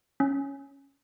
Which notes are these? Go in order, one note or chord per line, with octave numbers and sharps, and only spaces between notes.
C#4